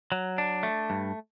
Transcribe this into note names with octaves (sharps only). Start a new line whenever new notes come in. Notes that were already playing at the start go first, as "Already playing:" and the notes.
F#3
D4
A3
G2